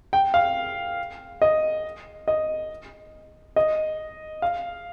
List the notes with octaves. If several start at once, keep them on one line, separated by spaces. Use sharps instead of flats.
G5
F5
D#5
D#5
D#5
F5